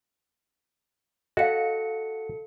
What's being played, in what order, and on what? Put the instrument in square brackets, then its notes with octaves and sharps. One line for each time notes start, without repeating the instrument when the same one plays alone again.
[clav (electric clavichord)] F#4 [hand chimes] A4 C#7 [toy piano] D#5 F5